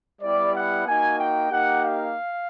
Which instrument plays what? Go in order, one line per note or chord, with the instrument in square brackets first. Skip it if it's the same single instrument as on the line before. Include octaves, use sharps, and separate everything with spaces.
[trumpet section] G3 B3 E4 G4 D5
F#5
A#3 D#4 F#4 G#5
G5
A#3 D#4 G4 F#5
F5